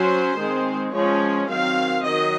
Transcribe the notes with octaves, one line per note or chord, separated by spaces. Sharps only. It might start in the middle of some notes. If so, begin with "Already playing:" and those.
Already playing: F#3 C#4 C5
D#3 G#3 C4
F3 G#3 C#4 C#5
D#3 F#3 C4 F5
D#3 F#3 D#5